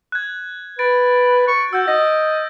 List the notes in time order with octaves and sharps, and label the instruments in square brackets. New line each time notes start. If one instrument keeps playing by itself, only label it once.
[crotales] F#6 G#6
[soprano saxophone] B4 [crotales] A6 D7
[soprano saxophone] C#6
[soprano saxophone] F#4 [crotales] E6 G6
[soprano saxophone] D#5 [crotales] A#6